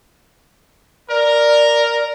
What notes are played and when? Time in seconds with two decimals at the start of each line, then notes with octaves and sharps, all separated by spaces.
1.10 A#4 D5